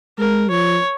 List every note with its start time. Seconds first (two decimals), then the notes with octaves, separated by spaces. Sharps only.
0.18 G#3 A#4
0.50 F3 C#5